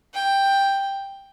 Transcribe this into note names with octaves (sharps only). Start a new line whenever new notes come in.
G5